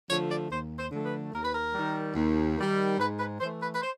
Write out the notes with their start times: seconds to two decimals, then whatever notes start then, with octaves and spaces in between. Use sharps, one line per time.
0.09 D3 F3 A3 C#5
0.29 D5
0.50 D#2 C5
0.78 C5
0.91 D3 F3 A3
1.05 B4
1.33 D#2 A#4
1.43 B4
1.53 A#4
1.74 D#3 G3
2.15 D#2
2.57 D#3 G3
2.98 G#2 B4
3.18 B4
3.39 E3 C5
3.43 A3
3.60 B4
3.74 B4
3.81 C5